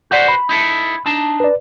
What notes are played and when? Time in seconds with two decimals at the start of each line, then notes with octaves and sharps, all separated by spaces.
0.11 F#4 B4 C5 D5 F#5 G6
0.28 B5
0.49 D#4 E4 A4
1.06 D4 D#4 A5
1.40 B4 D5